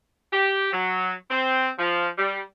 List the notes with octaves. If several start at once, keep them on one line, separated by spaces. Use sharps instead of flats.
G4
F#3
C4
F3
G3